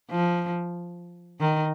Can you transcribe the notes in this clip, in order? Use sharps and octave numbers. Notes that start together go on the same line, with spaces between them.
F3
D#3